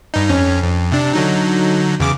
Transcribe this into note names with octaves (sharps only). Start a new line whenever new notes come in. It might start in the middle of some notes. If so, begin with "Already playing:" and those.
G2 D#4
F2 C#4
F2
C3 D4
D3 F#3 D#4
E2 C#3 D6